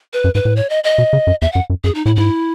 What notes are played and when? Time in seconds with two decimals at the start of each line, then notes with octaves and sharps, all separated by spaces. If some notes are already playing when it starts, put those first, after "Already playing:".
0.13 B4
0.24 F#2
0.35 G#2 B4
0.45 A2
0.56 C#5
0.70 D#5
0.84 D#5
0.98 B2
1.13 C#3
1.27 F#2
1.42 E2 E5
1.52 F#2 F#5
1.70 F#2
1.84 F#2 G#4
1.95 D#4
2.06 A2 E4
2.16 G#2 E4